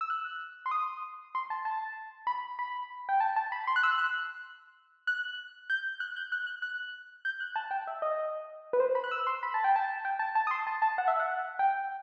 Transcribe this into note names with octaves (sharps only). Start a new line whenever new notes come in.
E6
F#6
C6
D#6
C6
A5
A5
B5
B5
G5
A5
A5
B5
C6
F#6
E6
F#6
F#6
G6
F#6
G6
F#6
F#6
F#6
G6
F#6
A5
G5
E5
D#5
B4
C5
B5
F#6
E6
C6
B5
A5
G5
A5
G5
A5
A5
D#6
C6
A5
A5
F#5
E5
F#5
G5